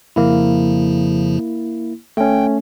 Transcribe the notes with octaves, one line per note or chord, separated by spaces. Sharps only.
F2 C#3 F3 A#3 E4
G1 A3 C#4 G5